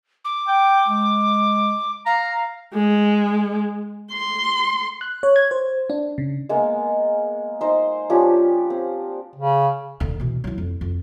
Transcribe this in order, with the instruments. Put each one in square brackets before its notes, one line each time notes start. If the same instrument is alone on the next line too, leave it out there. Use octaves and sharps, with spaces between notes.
[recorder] D6
[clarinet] G5
G#3
[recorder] F5 [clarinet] A#5
[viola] G#3
C6
[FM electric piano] F#6
C#5
G#6
C5
D4
C#3
[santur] G#3 A#3 B3 F5
D#4 C5
F3 C#4 D4 G4
C4
[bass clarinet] C#3
[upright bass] D#1 D3
B2 E3
F#3 E4
F2
F2